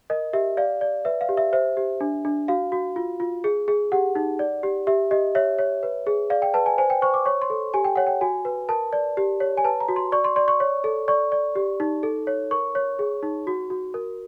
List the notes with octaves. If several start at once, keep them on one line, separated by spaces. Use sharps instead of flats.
A#4 D#5
G4 E5
D5 F5
D5
B4 E5
F5
G4
E5
C5 E5
G4
D4
D4
F#4 F5
F#4
F4
F4
G#4
G#4
G4 F#5
D#4
D5
G4
G4 E5
G4 D#5
C#5 E5
C#5
B4
G#4
D5 F5
G5
B4 A5
G#5
C5 G#5
G5
C5 C#6
D6
C#5 C#6
C6
A4
G4 G#5
G5
C#5 F#5
G5
F#4 G#5
B4
A#4 A5
D5
G4
C#5
G#5
B4 A5
A#5
F#4
C6
D5 C#6
C6
D5 C6
C#6
C#5
A4
D5 C#6
D5
G4
D#4
A4
C#5
A#4 C#6
C#5
G#4
D#4
F#4
F#4
A#4